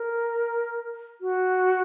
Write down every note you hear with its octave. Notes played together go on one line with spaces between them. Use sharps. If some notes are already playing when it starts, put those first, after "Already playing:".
Already playing: A#4
F#4